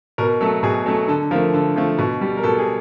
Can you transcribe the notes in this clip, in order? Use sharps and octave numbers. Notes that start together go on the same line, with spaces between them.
B2 A#4
F#3 A3 A4
B2 G#4
F#3 A3 A4
D3 A4
F3 A3 A#4
D3 A4
F3 A3
B2
G3
A#4
B2 A4
G#4